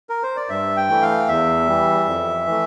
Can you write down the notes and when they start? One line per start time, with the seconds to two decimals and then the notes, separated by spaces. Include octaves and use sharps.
0.09 A#4
0.23 C5
0.36 D5
0.49 G2 E5
0.77 G5
0.89 E3 A3
1.02 F5
1.28 E2 E5
1.68 E3 G3
2.06 F2
2.46 E3 A3